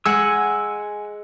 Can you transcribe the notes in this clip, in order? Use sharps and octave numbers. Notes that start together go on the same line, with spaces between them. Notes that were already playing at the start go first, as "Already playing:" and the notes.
G#3 F#5 G#5 E6